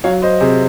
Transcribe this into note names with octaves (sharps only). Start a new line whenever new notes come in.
F#3 C#5 F5
C5 D#5
C3 G#4 C5